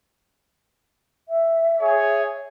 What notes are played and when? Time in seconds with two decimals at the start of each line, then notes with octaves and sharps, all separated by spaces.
1.29 E5
1.80 G#4 C#5